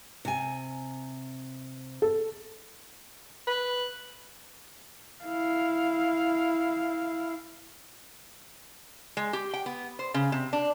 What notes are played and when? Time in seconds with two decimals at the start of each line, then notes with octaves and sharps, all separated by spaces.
0.25 C3 G#5
2.02 A4
3.47 B4
5.25 E4 F5
9.17 G#3
9.33 G4
9.54 G5
9.66 B3
9.99 C5
10.14 C#3
10.32 C3
10.53 D4